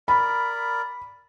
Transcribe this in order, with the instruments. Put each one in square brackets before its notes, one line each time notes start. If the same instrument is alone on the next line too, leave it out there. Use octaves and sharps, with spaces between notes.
[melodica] A#4 D5 [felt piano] B5